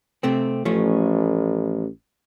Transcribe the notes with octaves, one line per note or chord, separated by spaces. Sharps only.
C3 A3 C4
A1 F3 A3 C#4